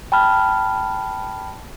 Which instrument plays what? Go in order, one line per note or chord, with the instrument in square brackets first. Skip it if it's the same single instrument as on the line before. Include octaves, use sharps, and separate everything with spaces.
[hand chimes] G5 A5 B5 F6